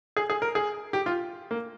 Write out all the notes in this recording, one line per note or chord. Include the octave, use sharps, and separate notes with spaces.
G#4
G#4
A#4
G#4
G4
F4
A#3